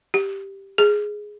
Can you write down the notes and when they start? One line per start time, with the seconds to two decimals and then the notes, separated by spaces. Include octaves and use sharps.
0.14 G4
0.78 G#4